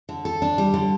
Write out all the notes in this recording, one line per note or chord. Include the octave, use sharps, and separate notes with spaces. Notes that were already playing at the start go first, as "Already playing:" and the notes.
D3
A4
D4
G3
D3